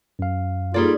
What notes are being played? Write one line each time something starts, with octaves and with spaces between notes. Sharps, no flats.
F#2 F5
G3 A#3 D#4 F4 G#4 A4 D5